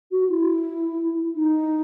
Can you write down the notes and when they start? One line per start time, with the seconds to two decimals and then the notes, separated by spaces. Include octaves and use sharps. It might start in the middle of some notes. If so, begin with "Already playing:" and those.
0.11 F#4
0.29 E4
1.35 D#4